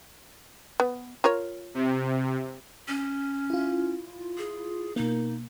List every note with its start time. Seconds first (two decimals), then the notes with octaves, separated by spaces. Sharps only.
0.80 B3
1.24 F4 A#4 C#5
1.74 C3
2.88 C#4
3.50 E4 F4
4.38 G#4
4.96 B2 A#3 D#4